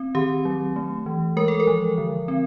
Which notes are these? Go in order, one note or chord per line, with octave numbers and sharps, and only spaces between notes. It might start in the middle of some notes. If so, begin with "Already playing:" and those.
Already playing: C4
D#3 G4
F#3
A3
E3
G#3 A#4
A4
A#4
F3
D3
C4